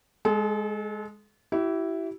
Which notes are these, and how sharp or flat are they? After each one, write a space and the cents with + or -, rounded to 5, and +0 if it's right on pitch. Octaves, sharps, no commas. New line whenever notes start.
G#3 +0 A4 -40
E4 +0 G4 -45